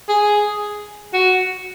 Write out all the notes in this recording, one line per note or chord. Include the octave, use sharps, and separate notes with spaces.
G#4
F#4